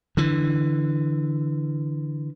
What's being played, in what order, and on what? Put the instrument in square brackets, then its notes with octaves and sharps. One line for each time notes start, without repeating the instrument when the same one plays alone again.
[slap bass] D3 E3